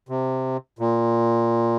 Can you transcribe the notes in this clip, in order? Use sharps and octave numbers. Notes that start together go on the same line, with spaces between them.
C3
A#2